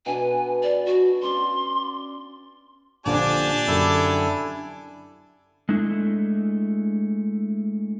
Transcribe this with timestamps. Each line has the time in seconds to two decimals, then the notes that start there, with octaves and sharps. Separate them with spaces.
0.06 B2 D4 B4 G#5
0.63 D5
0.86 F#4
1.22 C#4 D5 C6
3.06 A#1 D3 F3 D4 G4 D5 G#5 A5
3.68 F#2 D3 E4 A4
5.69 G#3 A3 D4 E4